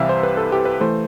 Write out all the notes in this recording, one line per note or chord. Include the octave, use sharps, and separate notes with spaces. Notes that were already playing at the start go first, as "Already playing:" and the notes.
Already playing: C2 C3 E3 E5 F5
C5
B4
A4
G4
B4
E3 A3 C5